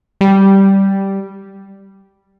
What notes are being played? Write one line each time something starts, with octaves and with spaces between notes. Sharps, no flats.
G3